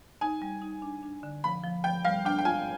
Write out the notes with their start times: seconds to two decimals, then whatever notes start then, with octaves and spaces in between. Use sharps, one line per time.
0.21 D#4 G#5
0.42 G3
0.62 D#4
0.82 D4
1.03 D4
1.23 D3
1.44 F3 B5
1.64 F3
1.84 F3 G5
2.05 G3 F5
2.25 D4 G5
2.38 G5
2.45 F4 G#5